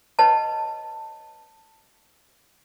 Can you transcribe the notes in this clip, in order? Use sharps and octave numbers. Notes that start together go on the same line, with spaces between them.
B4 C#5 D#5 F#5 A5